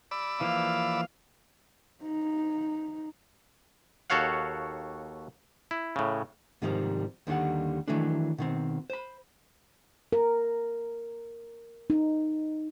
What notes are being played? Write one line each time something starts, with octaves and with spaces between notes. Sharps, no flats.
D5 B5 E6
E3 F3 A#3 F5
D#4
D#2 F#4 A4 C#5 F5 F#5
E4
A2 C#3
G#2 C3 D#3 F3 G3
D#2 D3 D#3 G3 F#5
D#3 E3 F#3 A3 D4
B2 D#3 C4
C5 B5
A#4
D#4